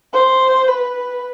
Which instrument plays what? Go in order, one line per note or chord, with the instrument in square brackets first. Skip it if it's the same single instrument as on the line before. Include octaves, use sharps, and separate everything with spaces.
[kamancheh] C5
B4